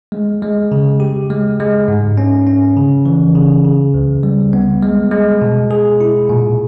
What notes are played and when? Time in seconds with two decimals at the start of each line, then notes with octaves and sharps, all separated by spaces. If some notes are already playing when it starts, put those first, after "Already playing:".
0.12 G#3
0.42 G#3
0.72 C#3
1.00 G4
1.30 G#3
1.60 G#3
1.88 G#2
2.17 C#4
2.47 C#4
2.77 C#3
3.06 E3
3.35 C#3
3.65 C#3
3.94 C#2
4.23 G3
4.53 B3
4.83 G#3
5.12 G#3
5.41 B2
5.71 G#4
6.01 E4
6.29 A#2